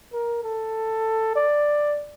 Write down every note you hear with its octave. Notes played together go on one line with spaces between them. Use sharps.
A#4
A4
D5